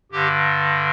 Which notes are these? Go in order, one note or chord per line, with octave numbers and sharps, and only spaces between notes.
G2 D3 G4